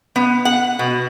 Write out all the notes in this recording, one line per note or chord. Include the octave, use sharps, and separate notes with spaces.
B3
F#5
B2